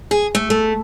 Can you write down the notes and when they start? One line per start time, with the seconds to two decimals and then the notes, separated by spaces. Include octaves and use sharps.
0.11 G#4
0.35 A3
0.50 A3